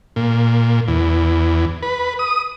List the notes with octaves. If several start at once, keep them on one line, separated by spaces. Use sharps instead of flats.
A#2
E2
B4
D#6